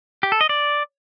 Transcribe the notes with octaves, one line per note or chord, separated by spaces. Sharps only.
G4
A4
D#5
D5